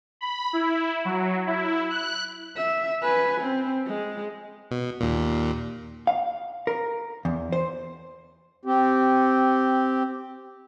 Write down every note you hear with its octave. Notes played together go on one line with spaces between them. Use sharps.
B5
E4
F#3
E4
F#6
E5
B4 G#5
C4
G#3
B2
D#2 A#2
F5
A#4
E2
C5
C4 G4